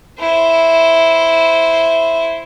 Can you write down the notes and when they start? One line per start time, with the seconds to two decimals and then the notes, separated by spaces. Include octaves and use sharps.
0.20 E4 C5